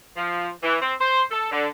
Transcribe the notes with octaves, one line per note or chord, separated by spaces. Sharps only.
F3
E3
C4
C5
A4
D3